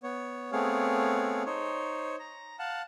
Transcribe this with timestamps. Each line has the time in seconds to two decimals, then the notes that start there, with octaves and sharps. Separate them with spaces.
0.04 B3 C#5
0.52 A3 B3 C4 G#4 C#5 F5
1.46 D#4 C5 C#5
2.19 A#5
2.59 F5 F#5 A5